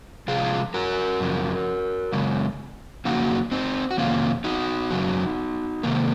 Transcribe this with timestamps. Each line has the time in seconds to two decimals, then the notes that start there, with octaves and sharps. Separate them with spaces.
0.28 C3 F3 G#3 F4 G#4
0.74 F#4 A#4
1.20 F#2 C#3 F3
2.13 F#2 C#3 G#3
3.05 F2 C#3 F#3 A#3 D#4 F#4
3.52 C4 D#4
3.91 F#4
3.98 F2 C3 D#3 A#3 C#4 F4
4.44 D#4 F#4
4.91 F#2 C#3 F#3
5.83 C3 D#3 A#3